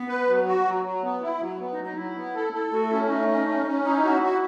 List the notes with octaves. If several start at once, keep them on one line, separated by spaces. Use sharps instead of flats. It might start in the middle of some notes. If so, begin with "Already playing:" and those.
Already playing: B3
B4
F#3
F#4
F#3
F#3
B3
E4
F#3
B3
D#4
F#3
D#4
F#3 E4
B3
A4
A4
A3 F#4
C#4 E4
A3 D#4
C#4
C#4
C#4
D#4 E4
F#4
F#4